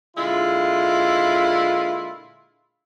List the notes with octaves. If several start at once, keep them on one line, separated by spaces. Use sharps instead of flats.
A#2 D3 G#3 E4 F4